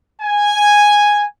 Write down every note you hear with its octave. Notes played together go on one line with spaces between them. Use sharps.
G#5